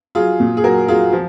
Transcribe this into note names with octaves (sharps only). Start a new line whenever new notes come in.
F#3 F4 G#4
A#2
G#4
F#3 F#4 A#4
F#3 F4 G#4
F3